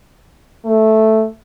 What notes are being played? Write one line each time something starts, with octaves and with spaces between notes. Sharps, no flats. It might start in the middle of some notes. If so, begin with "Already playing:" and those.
A3